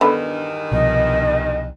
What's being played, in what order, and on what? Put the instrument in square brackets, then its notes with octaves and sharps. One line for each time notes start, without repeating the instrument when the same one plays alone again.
[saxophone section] E2 G2 D#3 [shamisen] D3 B3 B5
[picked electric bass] C2 B2 F3 [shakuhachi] D#5